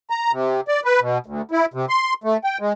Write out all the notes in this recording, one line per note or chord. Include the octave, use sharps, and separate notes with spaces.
A#5
C3
D5
B4
B2
D2
E4
C3
C6
A3
G5
G#3